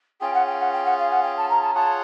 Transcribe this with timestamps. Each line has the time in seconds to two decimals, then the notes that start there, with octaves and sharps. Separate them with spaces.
0.21 C#4 F4 G#4 G5
0.34 F#5
0.46 G5
0.60 F#5
0.72 G5
0.84 F#5
0.98 F5
1.10 F#5
1.23 G5
1.37 A5
1.49 A#5
1.62 A5
1.74 F4 G#4 C#5 F#5 A5